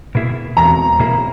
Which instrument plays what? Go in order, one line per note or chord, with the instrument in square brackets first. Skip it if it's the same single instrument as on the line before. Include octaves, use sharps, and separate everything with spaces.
[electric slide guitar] B2 A#3 E4 G#4
[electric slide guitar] E2 [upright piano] A#5
[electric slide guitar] B2 A#3 E4 G#4